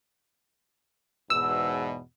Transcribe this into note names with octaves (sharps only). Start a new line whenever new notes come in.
E2 G#2 B2 E6